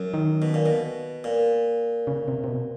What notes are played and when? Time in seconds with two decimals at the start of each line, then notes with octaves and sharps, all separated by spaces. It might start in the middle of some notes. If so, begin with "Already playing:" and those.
Already playing: F#2
0.14 D#3
0.42 B2
0.54 A#2
0.66 B2
1.24 A#2
2.07 C#3
2.28 C3
2.44 C3
2.48 B2